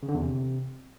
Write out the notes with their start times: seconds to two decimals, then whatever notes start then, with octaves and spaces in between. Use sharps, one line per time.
0.03 C#3
0.09 D3
0.14 E2
0.20 C3